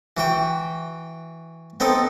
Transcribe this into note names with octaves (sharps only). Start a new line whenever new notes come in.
E3 F#4 G5
B3 C4 D#4 A4